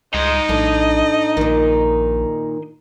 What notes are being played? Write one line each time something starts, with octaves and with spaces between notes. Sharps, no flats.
C#2 D#4 D#5 C6
A#1 A2 D4
A#1 A#2 D#3